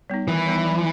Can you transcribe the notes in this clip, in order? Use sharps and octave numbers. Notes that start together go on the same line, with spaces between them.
G3 B3 D#4
D#3 E3
G3 B3 D#4
F#3